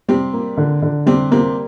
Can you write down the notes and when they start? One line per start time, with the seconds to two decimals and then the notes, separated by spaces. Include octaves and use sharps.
0.08 C3 G3 C4
0.33 A#3
0.57 D3
0.82 D3
1.06 C3 G3 C4
1.31 C3 A#3 C4